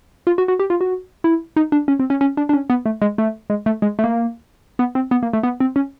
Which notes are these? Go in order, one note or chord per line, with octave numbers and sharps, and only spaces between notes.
F4
F#4
F#4
G4
F4
F#4
E4
D#4
D4
C#4
C4
C#4
C#4
D4
D4
C#4
B3
A3
G#3
A3
G#3
A3
G#3
A3
A#3
B3
C4
B3
A#3
A3
B3
C4
C#4